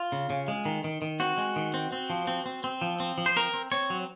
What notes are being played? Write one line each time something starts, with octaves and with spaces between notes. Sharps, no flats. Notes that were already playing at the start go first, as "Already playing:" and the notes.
Already playing: F4
C#3
C#3
G#3
D#3
D#3
D#3
C4 F#4
G#3
D#3
C4
C4
F3
C4
C4
C4
F3
C4
F3
C5
C4 A#4
C4
C4 C#5
F#3